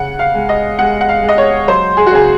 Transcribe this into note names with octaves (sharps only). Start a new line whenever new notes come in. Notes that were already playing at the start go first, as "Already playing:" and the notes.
Already playing: C#3 F#5
F5
G#3
D#5
G#3 F#5
F#5
F5
G#3
D#5
C#5
F#3 C5
G#4
F#4
C#3 G#4